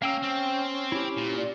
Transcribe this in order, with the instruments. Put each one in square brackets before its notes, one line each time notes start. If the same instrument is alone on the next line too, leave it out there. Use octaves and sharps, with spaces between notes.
[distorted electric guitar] A#3 [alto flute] C#4 [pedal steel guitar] F5 G5 E6
[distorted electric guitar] C4
[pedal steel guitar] E4 G4
[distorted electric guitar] A#2
[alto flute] D5